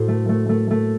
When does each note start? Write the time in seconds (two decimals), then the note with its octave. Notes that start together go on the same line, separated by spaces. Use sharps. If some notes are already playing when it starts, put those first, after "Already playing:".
Already playing: A2 F#4 A4 C5
0.08 A3
0.29 A3
0.49 A3
0.71 A3